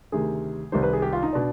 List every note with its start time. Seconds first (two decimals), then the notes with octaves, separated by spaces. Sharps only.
0.12 D2 C3 D#3 G#4
0.72 C2 C3 D#3 C5
0.83 B4
0.93 G#4
1.02 G4
1.13 F4
1.23 D#4
1.33 B2 D4